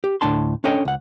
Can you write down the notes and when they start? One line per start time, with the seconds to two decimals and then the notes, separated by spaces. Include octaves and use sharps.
0.04 G4
0.21 D2 A2 D4 A5 C6
0.64 C#4 D4 A4 C#5 D#5 G5
0.85 C#2 F#5